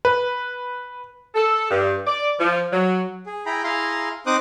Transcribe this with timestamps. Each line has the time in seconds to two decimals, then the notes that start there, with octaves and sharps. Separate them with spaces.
0.05 B4
1.35 A4
1.70 G2
2.06 D5
2.39 F3
2.72 F#3
3.26 G#4
3.46 E4 G#4 G5 A#5 B5
3.63 E4 G#4 F5 A#5 C6
4.27 C4 D#4 C5 D6 D#6 F#6